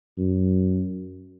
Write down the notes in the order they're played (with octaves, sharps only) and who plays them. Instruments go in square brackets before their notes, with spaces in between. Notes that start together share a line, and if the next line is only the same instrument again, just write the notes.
[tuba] F#2